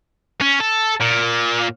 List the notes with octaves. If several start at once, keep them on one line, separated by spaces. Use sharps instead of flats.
C#4
A4
A#2